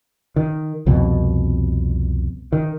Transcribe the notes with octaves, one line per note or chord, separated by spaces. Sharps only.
D#3
C2 F2 B2
D#3